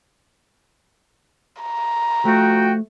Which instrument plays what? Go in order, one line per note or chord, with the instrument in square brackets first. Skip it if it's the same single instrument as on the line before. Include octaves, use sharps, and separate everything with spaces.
[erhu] A#5
[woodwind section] F3 F#4 G5 [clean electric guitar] A3